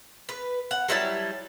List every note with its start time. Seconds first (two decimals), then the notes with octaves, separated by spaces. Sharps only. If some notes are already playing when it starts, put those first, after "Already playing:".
0.29 B4
0.71 F#5
0.89 F#3 G3 E4 A5